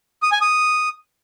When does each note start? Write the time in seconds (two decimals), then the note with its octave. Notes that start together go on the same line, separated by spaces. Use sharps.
0.23 D#6
0.32 G#5
0.41 D#6